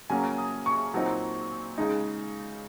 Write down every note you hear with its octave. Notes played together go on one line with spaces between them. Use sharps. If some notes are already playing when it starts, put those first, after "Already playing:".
C#3 F#3 A#3 C#4 G#5
D#6
C#6
A#2 F#3 C4 D#4
C#3 G#3 D#4